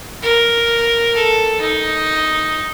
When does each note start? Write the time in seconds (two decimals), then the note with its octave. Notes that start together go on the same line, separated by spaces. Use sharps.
0.23 A#4
1.15 A4
1.61 D#4